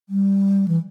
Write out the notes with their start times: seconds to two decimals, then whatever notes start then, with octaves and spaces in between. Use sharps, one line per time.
0.09 G3
0.68 E3